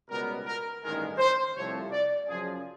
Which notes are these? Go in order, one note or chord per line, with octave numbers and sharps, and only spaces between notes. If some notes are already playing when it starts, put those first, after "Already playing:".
C#2 B2 G3 B3 A#4
A#4
A1 G2 D#3 G#3 A#4
C5
C2 C3 F3 A3 C4 C#5
D5
F#2 C#3 F3 G#4